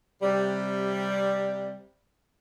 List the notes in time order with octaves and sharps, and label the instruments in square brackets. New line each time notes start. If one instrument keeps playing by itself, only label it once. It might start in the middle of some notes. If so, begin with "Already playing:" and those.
[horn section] C3 G3